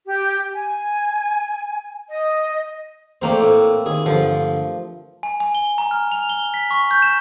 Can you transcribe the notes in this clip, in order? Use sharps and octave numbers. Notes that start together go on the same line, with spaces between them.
G4
G#5
D#5
A3 A#3 C4 C5 D5
A2
D#2 G#4 D#6
G2 D3 F3
G#5
G#5
G7
A#5
F6
F7
G7
B6
C#6
G6
E7